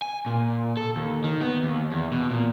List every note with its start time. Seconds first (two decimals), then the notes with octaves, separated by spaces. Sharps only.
0.02 G#5
0.26 A#2
0.77 A4
0.96 D#2
1.24 D#3
1.41 B3
1.63 D#2
1.92 E2
2.12 B2
2.30 A#2